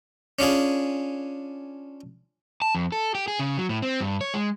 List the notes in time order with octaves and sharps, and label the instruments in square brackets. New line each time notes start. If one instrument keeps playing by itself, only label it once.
[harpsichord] C#4 D4 F4 G#4
[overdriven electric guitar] A5
F2
A4
G4
G#4
C#3
F#3
A2
C4
G2
C#5
G#3